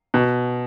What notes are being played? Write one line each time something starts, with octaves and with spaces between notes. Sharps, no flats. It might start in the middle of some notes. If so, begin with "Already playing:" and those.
B2